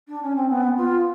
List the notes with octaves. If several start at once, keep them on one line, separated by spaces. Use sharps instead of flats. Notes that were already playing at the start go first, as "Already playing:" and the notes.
D4
C#4
C4
B3
F4